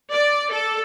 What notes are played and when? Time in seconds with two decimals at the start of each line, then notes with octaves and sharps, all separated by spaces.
0.12 D5
0.51 A4